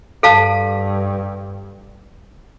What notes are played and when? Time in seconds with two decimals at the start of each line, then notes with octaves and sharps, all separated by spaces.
0.23 G2 A4 F5 A5